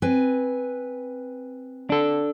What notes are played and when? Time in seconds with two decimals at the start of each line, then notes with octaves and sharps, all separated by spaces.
0.02 C4 B4 G#5
1.90 D4 A4